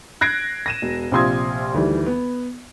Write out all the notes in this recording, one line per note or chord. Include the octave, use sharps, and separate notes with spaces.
F#6 G#6 A#6 C7 D7
A#6 D#7 E7
E1
A#1 C3 F4 C6 D#6 G#6
D2 D#3 E3 G3
B3